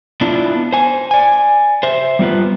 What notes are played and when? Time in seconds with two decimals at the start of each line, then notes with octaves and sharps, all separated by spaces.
0.21 B3 D4 E4 F4
0.73 C5 G#5
1.11 D5 G#5
1.83 C5 E5
2.19 G3 B3 F4 B4